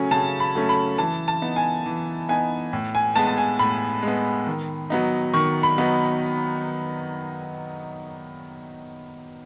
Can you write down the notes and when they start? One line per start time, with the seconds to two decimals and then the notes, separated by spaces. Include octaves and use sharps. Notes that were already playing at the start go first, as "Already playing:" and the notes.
Already playing: C#3 F#3 A3 C#4 G#5
0.11 C#3 A5
0.40 B5
0.55 F#3 A3 C#4
0.69 B5
0.98 E3 A5
1.28 A5
1.42 B3 D#4
1.56 G#5
1.86 E3
2.29 B3 D#4 G#5
2.73 A2
2.95 G#5
3.16 G#3 B3 A5
3.27 A5
3.38 G#5
3.59 A2 B5
4.03 G#3 B3
4.47 D#3
4.90 F#3 B3 D#4
5.34 D#3 C#6
5.63 B5
5.78 F#3 B3 D#4